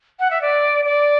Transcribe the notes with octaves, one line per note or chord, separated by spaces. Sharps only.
F#5
E5
D5
D5